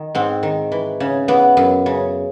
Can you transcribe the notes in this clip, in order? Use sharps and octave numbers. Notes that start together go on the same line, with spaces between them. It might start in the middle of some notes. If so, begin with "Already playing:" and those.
Already playing: D#3
G#2 C4
D#3
E3
C#3
E3 B3
F#2
C#3